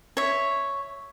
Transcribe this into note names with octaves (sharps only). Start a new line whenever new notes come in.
C#5 E5